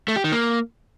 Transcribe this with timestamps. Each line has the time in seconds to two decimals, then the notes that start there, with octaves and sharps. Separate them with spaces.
0.08 A3
0.16 G4
0.24 D#3
0.32 A#3